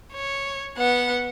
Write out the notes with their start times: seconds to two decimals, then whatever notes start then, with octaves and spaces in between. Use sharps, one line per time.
0.14 C#5
0.78 B3 F#5